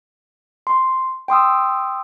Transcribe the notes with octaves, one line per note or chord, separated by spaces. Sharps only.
C6
G5 C6 D#6 E6